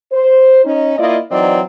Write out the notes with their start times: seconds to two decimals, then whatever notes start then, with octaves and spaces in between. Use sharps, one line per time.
0.12 C5
0.64 C#4 D#4
0.98 A#3 E4 F4 D5 D#5
1.31 E3 F#3 C4 D#4 D5 D#5